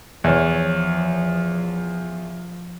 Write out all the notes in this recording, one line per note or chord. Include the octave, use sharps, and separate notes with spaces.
E2 F3 C#5